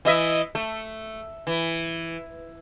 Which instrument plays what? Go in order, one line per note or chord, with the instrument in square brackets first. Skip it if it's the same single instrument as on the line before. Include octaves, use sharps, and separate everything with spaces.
[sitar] E3 D#5 E5
A3
E3